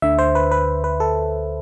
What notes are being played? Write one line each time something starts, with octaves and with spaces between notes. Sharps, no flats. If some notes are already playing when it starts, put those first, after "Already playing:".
D2 D3 E5
C5
B4
B4
B4
A4